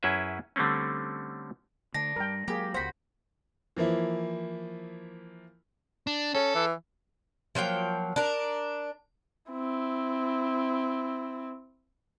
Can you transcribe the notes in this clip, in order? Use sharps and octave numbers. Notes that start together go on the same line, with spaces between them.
F#2 C#4 E4 G#4 B4 E5
D3 G3 A3 C4 C#4
D3 A3 D4 A#6
G2 G3 A#4 G5
F#3 G#3 A#3 G4 G#4
D#1 C#2 F#4 C5 B5
E3 F3 A#3 E4
D4
C#4 A4
E3
F3 F#3 A#3 G5
D4 A#4
C4 E4